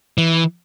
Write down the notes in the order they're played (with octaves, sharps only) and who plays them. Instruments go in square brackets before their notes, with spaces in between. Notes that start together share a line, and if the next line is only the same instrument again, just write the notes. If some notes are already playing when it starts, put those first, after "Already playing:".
[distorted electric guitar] E3